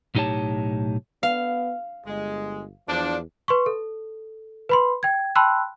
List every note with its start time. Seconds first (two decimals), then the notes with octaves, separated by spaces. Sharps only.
0.15 B1 A2 D#4 G4 C#5 A5
1.23 B3 F5
2.06 G1 G#3
2.88 E2 F3 D4
3.48 B4 C6 C#6
3.66 A4
4.69 B4 B5 C6
5.03 G5 G#6
5.35 G5 A5 B5 C6 E6 F#6